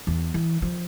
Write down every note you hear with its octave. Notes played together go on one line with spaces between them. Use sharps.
E2
E3
F3